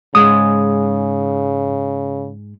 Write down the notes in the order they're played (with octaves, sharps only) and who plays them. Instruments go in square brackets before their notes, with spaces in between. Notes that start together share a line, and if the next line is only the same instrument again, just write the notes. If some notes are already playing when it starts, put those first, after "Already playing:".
[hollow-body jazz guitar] G#2 G#3 [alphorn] C#3 [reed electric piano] D#6